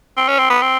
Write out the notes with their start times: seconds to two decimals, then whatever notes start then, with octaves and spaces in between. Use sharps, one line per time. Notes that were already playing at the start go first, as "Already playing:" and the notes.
0.17 C4
0.28 C#4
0.39 C4
0.50 B3
0.61 C4